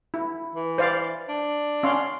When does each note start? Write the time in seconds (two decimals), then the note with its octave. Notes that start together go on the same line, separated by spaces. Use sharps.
0.14 E4
0.55 E3
0.78 C5 D5 F5
1.28 D4
1.83 C#4 F5 C6